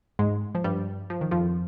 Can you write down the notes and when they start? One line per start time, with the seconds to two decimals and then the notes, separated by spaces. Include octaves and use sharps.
0.19 G#2 G#3
0.55 F3
0.64 G2 G3
1.10 F3
1.21 D#3
1.31 F2 F3